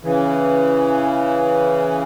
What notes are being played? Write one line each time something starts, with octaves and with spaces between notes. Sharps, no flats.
C#3 E3